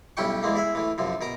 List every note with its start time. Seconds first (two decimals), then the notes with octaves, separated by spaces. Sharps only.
0.17 B1 G3 C#4 E4 G5 C#6
0.43 E2 E3 G#3 A#3
0.55 E4 G#4 E5
0.75 A2 E3
0.98 F#2 C3 F3
1.21 B2 A#4 A#5